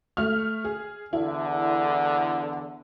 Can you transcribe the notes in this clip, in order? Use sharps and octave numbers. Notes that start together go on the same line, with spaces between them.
A3 F6
G#4
E2 D3 E4